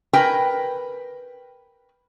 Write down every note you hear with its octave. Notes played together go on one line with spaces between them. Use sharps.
A#4 B4 G5 G#5